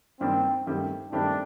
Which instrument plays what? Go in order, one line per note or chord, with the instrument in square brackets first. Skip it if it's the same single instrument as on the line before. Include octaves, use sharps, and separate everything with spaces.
[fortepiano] G2 D#3 A#3 D4 [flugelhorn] C4
[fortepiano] G2 D#3 A3 C4 G4
[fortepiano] G2 D#3 A3 C4 G4 [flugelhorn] D4